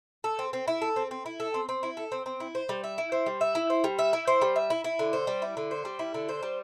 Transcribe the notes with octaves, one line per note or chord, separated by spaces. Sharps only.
A4
C4
C4
E4
A4
C4
C4
E4
A4
C4
C4
E4
A4
C4
C4
E4
C5
G3
E5
E4
C5
G3
E5
E4
C5
G3
E5
E4
C5
G3
E5
E4
E4
D3
C5
G3
E4
D3
C5
G3
E4
D3
C5
G3